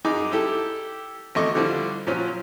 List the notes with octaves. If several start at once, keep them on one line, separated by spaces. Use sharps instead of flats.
F#2 D#4 G#4 D6
E4 G4 A4
G#1 E2 A3 D#5 C#6 D6
D3 F3 G3 D4 E4
A#2 F3 F#3 C#4